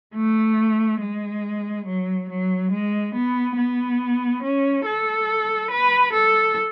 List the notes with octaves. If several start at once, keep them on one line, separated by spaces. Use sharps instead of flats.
A3
G#3
F#3
F#3
G#3
B3
B3
C#4
A4
B4
A4